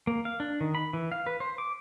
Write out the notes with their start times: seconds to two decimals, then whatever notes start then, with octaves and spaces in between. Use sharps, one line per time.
0.07 A#3
0.25 F5
0.40 D4
0.61 D#3
0.75 B5
0.93 E3
1.12 F5
1.27 B4
1.40 C5
1.58 D6